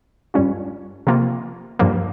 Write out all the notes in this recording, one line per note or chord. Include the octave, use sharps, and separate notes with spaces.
G2 G3 C#4 F4
C3 F3 A#3 F4
G2 F3 A#3